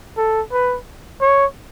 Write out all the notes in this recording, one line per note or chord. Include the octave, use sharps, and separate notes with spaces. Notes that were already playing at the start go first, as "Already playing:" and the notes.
A4
B4
C#5